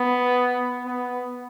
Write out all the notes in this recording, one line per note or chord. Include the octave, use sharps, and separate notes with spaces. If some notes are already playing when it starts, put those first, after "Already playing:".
Already playing: B3
B3